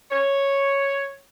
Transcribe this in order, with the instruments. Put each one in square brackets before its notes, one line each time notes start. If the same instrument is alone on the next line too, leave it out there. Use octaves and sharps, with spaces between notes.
[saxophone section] C#5